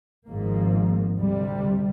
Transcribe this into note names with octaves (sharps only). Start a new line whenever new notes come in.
G#1 G#2 F3 A#3
D2 C3 G3